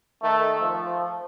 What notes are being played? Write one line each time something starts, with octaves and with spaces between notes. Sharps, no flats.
D#3 A3
F3